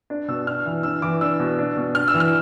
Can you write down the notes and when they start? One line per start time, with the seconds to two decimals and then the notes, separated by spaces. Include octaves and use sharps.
0.10 D4
0.28 B2 E6
0.47 D4 F6
0.66 E3
0.83 D4 E6
1.02 E3 D6
1.21 D4 E6
1.39 B2
1.59 D4
1.77 B2
1.95 D4 F6
2.08 E6
2.14 E3
2.20 F6